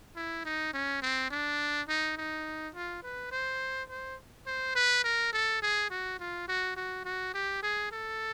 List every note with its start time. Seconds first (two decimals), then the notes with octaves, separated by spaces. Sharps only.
0.16 E4
0.45 D#4
0.74 C#4
1.02 C4
1.31 D4
1.88 D#4
2.17 D#4
2.75 F4
3.03 B4
3.31 C5
3.90 C5
4.46 C5
4.76 B4
5.04 A#4
5.33 A4
5.62 G#4
5.91 F#4
6.20 F4
6.48 F#4
6.77 F#4
7.05 F#4
7.34 G4
7.63 G#4
7.92 A4